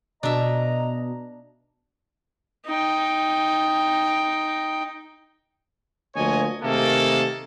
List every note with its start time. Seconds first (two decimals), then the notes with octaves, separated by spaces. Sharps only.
0.23 B2 D4 D#5 E5 A#5
2.66 D#4 G5
6.16 D2 F3 A#3 C#5 D#5 G#5
6.63 C3 D#3 A3 A#3 G#4 A4